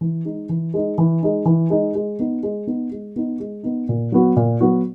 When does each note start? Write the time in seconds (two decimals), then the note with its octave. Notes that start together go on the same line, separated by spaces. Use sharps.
0.01 E3
0.25 G#3 D#4
0.49 E3
0.74 G#3 D#4
0.98 E3
1.23 G#3 D#4
1.46 E3
1.70 G#3 D#4
1.95 G#3
2.19 B3 D#4
2.43 G#3
2.67 B3 D#4
2.92 G#3
3.16 B3 D#4
3.40 G#3
3.63 B3 D#4
3.89 A#2
4.12 F#3 B3 F#4
4.36 A#2
4.61 F#3 B3 F#4